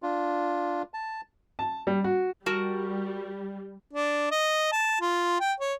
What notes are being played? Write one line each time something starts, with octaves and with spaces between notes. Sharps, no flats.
D4 F4
A5
A5
G3
F#4
G3 F#4 A#4 A5
D4
D#5
A5
F4
G5
C#5